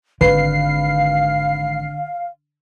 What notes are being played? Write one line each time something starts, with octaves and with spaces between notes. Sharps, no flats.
G#1 D3 B4 F5 C7